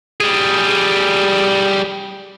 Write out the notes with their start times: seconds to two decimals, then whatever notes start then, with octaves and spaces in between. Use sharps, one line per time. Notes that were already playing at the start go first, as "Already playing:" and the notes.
0.20 G3 G#4